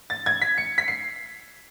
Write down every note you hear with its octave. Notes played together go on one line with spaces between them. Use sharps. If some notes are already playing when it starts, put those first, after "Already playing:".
A6
G#6
B6
C#7
B6
C7